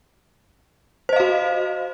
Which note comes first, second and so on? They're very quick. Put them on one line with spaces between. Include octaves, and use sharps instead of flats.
C5 D#5 F5 F#4